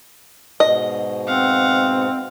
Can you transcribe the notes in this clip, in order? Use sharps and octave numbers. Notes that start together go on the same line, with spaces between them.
G#2 B2 D#5
C4 F5 F#5